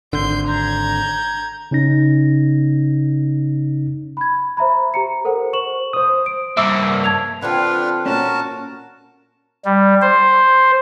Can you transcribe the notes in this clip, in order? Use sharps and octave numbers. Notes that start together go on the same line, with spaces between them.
G#1 D3 C6 G6
A#5 G6 G#6
C#3 C#4 D#4 A#6
B5 G#6
C5 E5 A#5 B5
G4 A#5 C#7
A4 A#4 C5 F#5
C5 C#6 E7 F#7
C5 D#6
D7
G2 A#3 E5 D6 E6
A5 G#6 F7
D3 C4 D4 F4 B4
A#2 C#4 F#4 A#4 A5
G3
C5